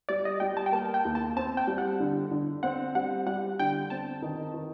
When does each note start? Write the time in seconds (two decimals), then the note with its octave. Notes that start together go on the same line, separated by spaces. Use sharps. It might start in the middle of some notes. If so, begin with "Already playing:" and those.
0.09 G3 D5
0.25 D#5
0.40 G3 G5
0.57 A5
0.66 G5
0.72 A#3 A5
0.94 G5
1.05 D#2
1.15 A5
1.36 C4 A5
1.57 G5
1.67 G3
1.78 F#5
2.00 D3
2.31 D3
2.63 C4 F#5
2.95 G3 F#5
3.26 G3 F#5
3.59 D3 G5
3.90 C4 A5
4.22 D#3
4.54 D#3